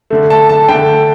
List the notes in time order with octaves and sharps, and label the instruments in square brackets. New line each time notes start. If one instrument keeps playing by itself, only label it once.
[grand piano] D3 A3
A5
A5
D3 A3 G5